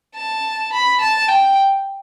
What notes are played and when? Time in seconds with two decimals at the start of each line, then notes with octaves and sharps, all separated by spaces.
0.15 A5
0.72 B5
1.00 A5
1.28 G5